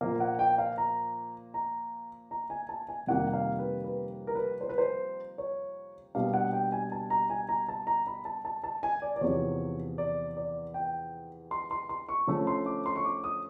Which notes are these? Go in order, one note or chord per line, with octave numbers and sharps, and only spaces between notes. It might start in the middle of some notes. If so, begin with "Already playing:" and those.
A#2 F3 A#3 F5
F#5
G5
F5
A#5
A#5
A#5
G#5
A5
G#5
F2 C3 D#3 G3 A#3 F#5
F5
B4
B4
A#4
B4
C5
B4
C5
C#5
B2 G3 A#3 D4 F5
F#5
G5
G#5
A5
A#5
G#5
A#5
A5
A#5
B5
A5
A5
A5
G#5
D5
D5
E2 C3 F3 C#5
D5
D5
G5
C6
C6
C6
C#6
D3 F3 A3 C#4
C6
D6
C6
C#6
D6
D#6